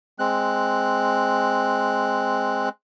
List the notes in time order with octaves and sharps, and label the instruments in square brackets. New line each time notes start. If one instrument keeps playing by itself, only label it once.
[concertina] G#3 C4 F#6